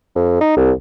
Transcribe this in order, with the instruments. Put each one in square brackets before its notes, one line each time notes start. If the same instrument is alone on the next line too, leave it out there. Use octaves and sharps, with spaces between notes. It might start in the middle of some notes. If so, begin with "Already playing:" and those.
[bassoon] F2
D#4
C2